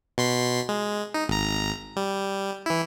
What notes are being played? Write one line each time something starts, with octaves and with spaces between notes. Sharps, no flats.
B2 C6 B6
G#3
D#4
G#1 A#5
G3
E3 E4